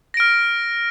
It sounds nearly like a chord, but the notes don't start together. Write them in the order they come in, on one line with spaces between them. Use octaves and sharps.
A#6 D7 F6